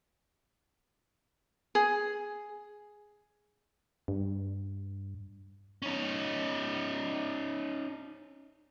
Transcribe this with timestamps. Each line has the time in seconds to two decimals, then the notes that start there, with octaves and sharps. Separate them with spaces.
1.75 G#4
4.08 G2
5.82 C#4 D#4